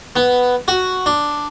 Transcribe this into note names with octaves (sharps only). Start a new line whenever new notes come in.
B3
F#4
D4